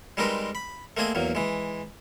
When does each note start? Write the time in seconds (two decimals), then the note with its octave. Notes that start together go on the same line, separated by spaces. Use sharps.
0.17 G3 G#3 C4 D#4 A#4 B4
0.55 B5
0.97 A3 A#3 C4 G#4 D#5 D#6
1.15 E2 F#3 A#3
1.35 E3 G#3